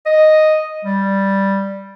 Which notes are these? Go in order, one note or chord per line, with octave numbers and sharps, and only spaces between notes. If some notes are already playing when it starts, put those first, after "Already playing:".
D#5
G3